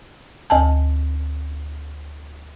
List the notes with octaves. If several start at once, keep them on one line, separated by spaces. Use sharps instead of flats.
D2 G#5 A5